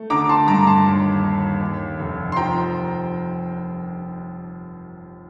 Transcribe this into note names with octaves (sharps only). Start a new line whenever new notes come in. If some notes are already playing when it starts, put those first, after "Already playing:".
Already playing: A3
D3 A#5 D6
A5 C6
G2 A#5 D6
A#5
A5 C6
D#2
D#2
D#2
F1
C6
F3 G5 A#5